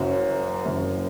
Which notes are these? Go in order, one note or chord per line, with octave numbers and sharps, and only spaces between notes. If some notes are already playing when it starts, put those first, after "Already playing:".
Already playing: F#1 F#2 F#3
F#1 F#2 F#3